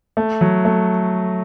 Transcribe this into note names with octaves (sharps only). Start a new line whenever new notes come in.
A3
F#3
A3